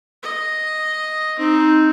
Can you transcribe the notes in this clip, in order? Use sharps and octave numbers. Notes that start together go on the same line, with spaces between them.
D#5
C4 D#4